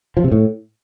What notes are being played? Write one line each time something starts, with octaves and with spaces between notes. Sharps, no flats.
F3
C3
A2